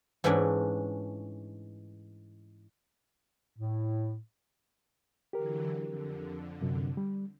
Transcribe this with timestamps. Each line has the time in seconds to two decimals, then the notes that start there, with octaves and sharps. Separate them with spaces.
0.24 G#2 E3 G#3 A3 C#4 D4
3.57 A2
5.33 D3 E3 F#3 G4 A#4
5.86 F2 D3
6.61 F#2 C3
6.97 G3